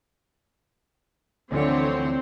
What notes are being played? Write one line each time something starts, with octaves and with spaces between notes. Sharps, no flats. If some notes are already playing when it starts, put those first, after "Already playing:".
D2 D3 E3 F3 C4 C#5